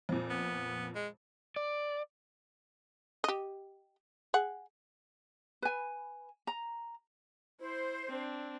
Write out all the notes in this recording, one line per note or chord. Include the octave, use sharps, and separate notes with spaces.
F2 A#2
B3
G#3
D5
G4 D#5
G#4 F#5
B4 G#5
A#5
E4 C5
C4 D4